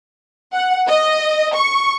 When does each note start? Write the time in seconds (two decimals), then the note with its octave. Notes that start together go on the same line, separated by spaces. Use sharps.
0.53 F#5
0.88 D#5
1.54 C#6